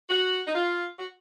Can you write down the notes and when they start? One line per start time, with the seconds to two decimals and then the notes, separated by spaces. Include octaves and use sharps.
0.10 F#4
0.47 D#4
0.55 F4
0.99 F#4